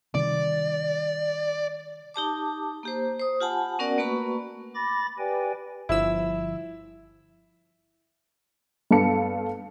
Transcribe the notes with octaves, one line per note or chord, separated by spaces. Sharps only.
C3 D#3 G3 D5
D#4 G4 A5 D6
A#3 G4 C5
C5 D#6
F4 G4 F#5 G#5 A5 B5
B3 C#4 F#4 A#4 D5 F#5
A3 A#3 F#4 B4 B5 C#6
B5 D6 A6 A#6
G4 B4 D5 G5 G#5
G1 F3 E4 E6
G2 B3 A4 F5 A5 C#7